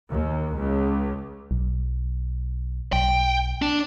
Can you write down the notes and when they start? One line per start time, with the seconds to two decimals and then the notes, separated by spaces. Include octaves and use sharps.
0.10 D#2
0.56 C#2
1.51 B1
2.93 B1 G5
3.62 D4